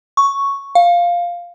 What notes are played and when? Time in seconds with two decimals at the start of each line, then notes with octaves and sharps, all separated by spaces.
0.17 C#6
0.75 F5